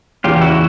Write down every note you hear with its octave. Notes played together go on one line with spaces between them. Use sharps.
E2 C#3 E3 F4 G4
G4
E4 F#4